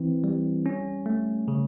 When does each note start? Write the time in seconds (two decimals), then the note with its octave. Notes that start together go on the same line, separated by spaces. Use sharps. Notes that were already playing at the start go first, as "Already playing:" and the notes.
Already playing: E3 C4 E4
0.24 G3
0.66 C#4
1.06 A3
1.48 C#3